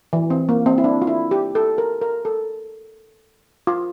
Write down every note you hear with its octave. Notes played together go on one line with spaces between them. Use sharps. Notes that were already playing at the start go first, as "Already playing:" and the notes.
E3
C4
A#3
C4
E4
D4
F4
E4
G4
A4
A#4
A#4
A4
F4